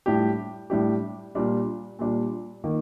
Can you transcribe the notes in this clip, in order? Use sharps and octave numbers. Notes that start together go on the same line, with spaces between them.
A2 G3 D4 G4
A2 G3 D4 G4
A#2 G3 D4 F4
A#2 G3 D4 F4
D#3 A#3